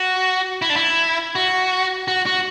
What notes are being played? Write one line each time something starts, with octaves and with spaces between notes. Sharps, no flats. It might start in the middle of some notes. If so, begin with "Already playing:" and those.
Already playing: F#4
E4
D4
E4
F#4
F#4
F#4